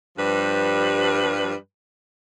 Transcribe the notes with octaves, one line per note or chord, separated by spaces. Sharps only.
G2 F3 G3 B4